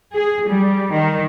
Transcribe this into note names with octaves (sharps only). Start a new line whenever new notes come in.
G#4
G3
D#3